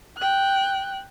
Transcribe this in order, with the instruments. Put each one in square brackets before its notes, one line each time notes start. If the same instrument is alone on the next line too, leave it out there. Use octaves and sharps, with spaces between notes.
[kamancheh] G5 F#6